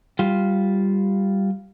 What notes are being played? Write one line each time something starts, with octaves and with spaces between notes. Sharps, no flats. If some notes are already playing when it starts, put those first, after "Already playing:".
G3 F4